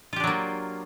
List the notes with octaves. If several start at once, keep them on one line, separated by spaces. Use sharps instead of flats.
F#3 A#3 D4 F4 G4